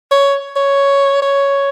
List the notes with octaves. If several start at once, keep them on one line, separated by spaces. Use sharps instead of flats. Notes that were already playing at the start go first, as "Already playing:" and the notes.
C#5
C#5
C#5